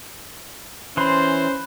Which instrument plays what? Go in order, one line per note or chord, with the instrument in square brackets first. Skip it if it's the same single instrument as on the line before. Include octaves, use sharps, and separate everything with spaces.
[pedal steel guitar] E3 C6 [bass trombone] C#4 [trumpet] C5 [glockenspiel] B5 F#6